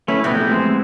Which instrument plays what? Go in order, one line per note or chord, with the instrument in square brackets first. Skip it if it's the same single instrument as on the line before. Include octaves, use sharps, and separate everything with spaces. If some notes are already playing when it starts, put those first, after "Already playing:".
[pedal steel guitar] A3 C#4 E4 [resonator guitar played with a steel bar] B4
[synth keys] A#1 A3 [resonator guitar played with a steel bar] C3 E3 B3 [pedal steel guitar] G6
[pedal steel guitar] G#3 C4